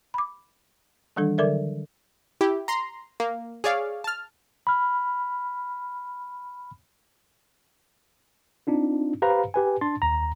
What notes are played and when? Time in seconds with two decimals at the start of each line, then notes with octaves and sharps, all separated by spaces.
0.14 B5 D6
1.16 D#3 E3 G3 D4 A4
1.38 D3 F#3 A4 A#4 D5 E5
2.41 E4 G4
2.68 A#5 C6
3.20 A#3
3.64 G#4 C#5 D5 F5
4.04 A5 F6
4.67 B5 F6
8.67 C4 D4 D#4 F4
9.22 G4 B4 C5 F5 A#5 B5
9.54 G4 B4 G#5
9.81 D4 A5 C6 A6
10.02 D#2 A#5